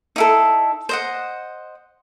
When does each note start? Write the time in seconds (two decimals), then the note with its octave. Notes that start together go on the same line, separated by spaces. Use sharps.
0.16 D#4 E4 A4
0.89 C5 D#5 F#5